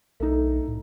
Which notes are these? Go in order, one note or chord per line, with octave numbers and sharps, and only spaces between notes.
B1 A3 D#4
A2